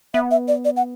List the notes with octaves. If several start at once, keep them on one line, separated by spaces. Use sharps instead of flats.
B3 E5
E5
D5
D5
F#5